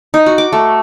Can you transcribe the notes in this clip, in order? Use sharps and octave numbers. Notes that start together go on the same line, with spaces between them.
D#4
F#4
D6
A3